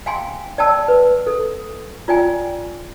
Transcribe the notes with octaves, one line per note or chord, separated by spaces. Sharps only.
F5 G5 G#5 C6
D5 G5 A5 E6
B4
A4
F4 D5 G5 G#5